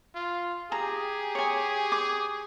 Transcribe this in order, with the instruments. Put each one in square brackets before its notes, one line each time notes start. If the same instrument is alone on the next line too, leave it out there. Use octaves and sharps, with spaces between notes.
[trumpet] F4
[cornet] G4 [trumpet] G#4 [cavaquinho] A#5
[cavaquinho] C#5 G#5
D6